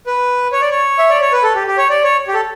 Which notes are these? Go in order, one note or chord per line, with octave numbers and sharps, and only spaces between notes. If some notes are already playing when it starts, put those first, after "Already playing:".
B4
C#5
D5
C#5
E5
D5
C#5
B4
A4
G4
G4
C#5
D5
C#5
G4
A4